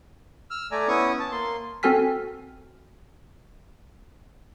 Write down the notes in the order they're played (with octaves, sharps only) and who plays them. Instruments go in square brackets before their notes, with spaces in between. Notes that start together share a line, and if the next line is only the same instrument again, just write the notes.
[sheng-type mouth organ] E6 F6
A3 D5 G#5 A#5
B3 C#4 E4 C#6 D#6
A5
A#3 C6
[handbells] C4 F#4 A4 G#5 F6 B6